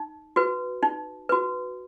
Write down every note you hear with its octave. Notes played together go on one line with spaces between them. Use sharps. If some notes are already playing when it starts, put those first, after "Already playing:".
Already playing: D#4
F#4 B4
D#4
F#4 B4